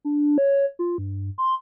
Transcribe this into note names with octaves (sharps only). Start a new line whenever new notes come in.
D4
C#5
F4
G2
C6